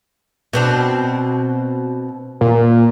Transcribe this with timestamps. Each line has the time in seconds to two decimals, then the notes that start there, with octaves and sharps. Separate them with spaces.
0.53 B2 C4 D4
2.41 A#2